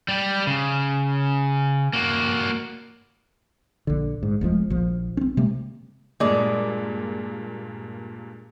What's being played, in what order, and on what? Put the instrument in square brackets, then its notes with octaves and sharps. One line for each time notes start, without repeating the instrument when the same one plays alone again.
[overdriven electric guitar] G3 G4
C#3
A#3 F#4
[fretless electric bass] A#1 D3
G#2
F1 E2 F3 G#3
A#1 F3
C4 C#4
C3 G#3 A#3
[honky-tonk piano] G2 A#2 [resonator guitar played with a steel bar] G#3 D5